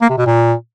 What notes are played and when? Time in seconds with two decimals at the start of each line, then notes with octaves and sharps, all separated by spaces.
0.02 A#3
0.10 C3
0.18 B2
0.26 A#2